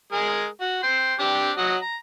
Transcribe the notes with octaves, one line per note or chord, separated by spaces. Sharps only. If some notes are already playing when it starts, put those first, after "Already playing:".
G#3 G#4 A#4
F#4
G5 C6
C4 D4 G4
F#3 F#4 D#5
A#5